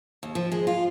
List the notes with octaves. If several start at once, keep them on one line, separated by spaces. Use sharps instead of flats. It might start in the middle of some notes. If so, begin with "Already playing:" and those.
D#2
F3
G#3
F4